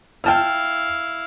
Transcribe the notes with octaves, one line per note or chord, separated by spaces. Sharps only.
E4 F5 G5 A5 F6